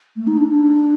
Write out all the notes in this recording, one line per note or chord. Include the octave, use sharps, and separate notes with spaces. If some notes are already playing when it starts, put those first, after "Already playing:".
A3
D#4
D4
D4